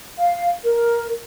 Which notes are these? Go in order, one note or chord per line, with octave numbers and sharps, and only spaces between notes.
F5
A#4